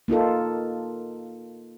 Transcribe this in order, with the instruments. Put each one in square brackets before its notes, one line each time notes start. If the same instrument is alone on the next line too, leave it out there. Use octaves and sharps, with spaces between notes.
[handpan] A#3 D#4 F4 A4